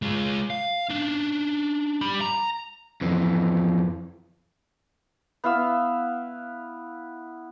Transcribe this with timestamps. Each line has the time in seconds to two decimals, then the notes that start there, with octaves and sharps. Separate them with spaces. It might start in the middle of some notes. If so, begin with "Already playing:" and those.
0.02 G#3 F4
0.50 F5
0.89 C#4 D4
2.01 G3 B5
2.21 A#5
3.01 F2 E3
5.44 B3 E4 F5 E6